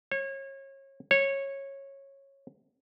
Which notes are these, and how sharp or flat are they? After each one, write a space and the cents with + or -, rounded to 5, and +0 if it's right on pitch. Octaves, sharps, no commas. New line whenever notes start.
C#5 -30
C#5 -15